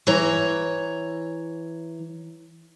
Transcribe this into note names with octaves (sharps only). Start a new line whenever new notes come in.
E3 C#5 A#5